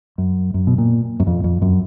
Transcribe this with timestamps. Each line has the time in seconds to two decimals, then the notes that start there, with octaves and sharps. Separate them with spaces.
0.18 F#2
0.54 F#2
0.67 B2
0.78 A#2
1.20 F#2
1.27 F2
1.44 F2
1.62 F#2